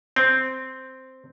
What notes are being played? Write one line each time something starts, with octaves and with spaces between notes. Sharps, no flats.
C4